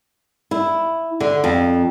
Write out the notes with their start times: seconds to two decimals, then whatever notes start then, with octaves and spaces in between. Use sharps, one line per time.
0.51 E4
1.20 D3
1.44 F2